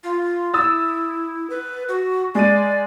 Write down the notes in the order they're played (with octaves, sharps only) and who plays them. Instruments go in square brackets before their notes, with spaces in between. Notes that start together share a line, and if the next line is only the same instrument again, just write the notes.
[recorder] F4
[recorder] E4 [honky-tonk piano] D#6 E6 A6
[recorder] B4
F#4
[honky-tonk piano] G#3 D#7 [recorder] D5